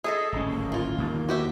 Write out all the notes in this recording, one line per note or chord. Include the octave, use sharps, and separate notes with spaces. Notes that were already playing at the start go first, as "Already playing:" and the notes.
G#4 A4 D#5 E5
D1 G#1 C#4
A#3
E3 F4
E2 D#3 A#3
F#4 G4 E5